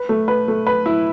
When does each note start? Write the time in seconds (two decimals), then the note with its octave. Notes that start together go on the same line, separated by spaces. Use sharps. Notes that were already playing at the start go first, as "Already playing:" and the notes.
Already playing: B4
0.09 A3
0.28 B4
0.48 A3
0.67 B4
0.86 E4